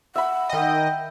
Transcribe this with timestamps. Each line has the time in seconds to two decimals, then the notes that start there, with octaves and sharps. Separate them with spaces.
0.16 E5 F#5 B5
0.49 D#3 D#5 G5